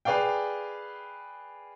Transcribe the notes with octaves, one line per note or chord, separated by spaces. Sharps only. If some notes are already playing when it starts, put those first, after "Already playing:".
G#4 B4 D5 F5 G5